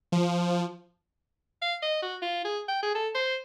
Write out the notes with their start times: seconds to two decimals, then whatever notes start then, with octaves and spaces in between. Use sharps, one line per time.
0.12 F3
1.62 F5
1.83 D#5
2.03 F#4
2.22 F4
2.45 G#4
2.68 G5
2.83 G#4
2.95 A4
3.15 C5